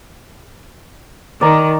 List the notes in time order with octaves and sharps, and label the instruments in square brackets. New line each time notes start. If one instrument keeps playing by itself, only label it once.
[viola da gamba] D#3 [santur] D5 A#5